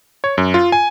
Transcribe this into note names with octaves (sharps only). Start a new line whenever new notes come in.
C#5
F#2
F4
G#5